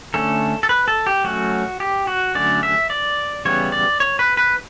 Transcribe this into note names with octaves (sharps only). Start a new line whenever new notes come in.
D3 A3 C#4 A4
A4
B4
A4
G4
F#3 A3 C#4 F#4
G4
F#4
D3 F#3 A3 C#4 D5
E5
D5
C#3 E3 G3 B3 C#5
D5
C#5
B4
B4